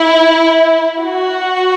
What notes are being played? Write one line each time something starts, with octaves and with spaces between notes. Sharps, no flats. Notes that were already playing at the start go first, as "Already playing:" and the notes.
Already playing: E4
F#4